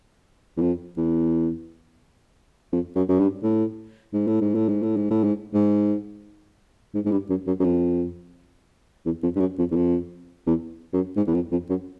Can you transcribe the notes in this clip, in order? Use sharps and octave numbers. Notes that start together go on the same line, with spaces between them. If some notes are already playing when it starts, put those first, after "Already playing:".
E2
F2
E2
F2
F#2
F#2
G2
A2
G#2
A2
G#2
A2
G#2
A2
G#2
A2
G#2
G#2
G#2
G#2
G2
F#2
F#2
F#2
F2
E2
F2
G2
F#2
F2
E2
F2
E2
F#2
G#2
E2
F2
F2
F#2